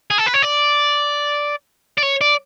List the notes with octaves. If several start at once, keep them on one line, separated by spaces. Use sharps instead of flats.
G#4
A4
B4
C#5
D5
D5
C#5
D5